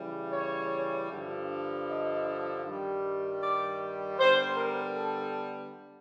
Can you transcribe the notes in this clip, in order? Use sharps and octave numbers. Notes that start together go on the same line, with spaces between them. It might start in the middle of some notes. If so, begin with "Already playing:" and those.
Already playing: C#3 E3 G3
C#5
G2 D3 F3
D#5
G2 D#3 G3
D5
D3 G3 B3 C5
A#4
A4